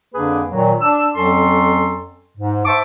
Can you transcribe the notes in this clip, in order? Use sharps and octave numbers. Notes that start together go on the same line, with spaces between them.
F2 D3 A#3 D4 G#4 B4
A#2 D#3 F#3
D4 E6
F2 F#3 C#4 A4 C6
G#2
C5 E5 A5 C#6 D6